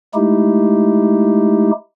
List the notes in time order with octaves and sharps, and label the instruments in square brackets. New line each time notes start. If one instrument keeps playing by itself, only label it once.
[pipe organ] G#3 A3 D#4 E4 G4